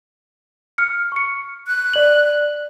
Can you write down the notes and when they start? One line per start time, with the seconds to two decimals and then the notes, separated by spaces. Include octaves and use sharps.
0.78 F6 C#7
1.12 C#6 C#7
1.67 F#6
1.93 D5 F#7